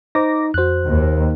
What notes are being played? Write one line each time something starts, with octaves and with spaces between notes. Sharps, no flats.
D#4 C5 D6 A#6
F2 F#4 C5 F#6
D#2